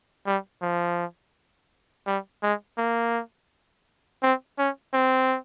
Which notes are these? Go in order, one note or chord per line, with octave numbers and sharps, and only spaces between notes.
G3
F3
G3
G#3
A#3
C4
C#4
C4